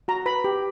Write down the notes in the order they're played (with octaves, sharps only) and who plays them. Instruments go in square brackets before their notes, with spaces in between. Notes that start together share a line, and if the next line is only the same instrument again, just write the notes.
[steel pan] F#4 A#5
B4 B5
G4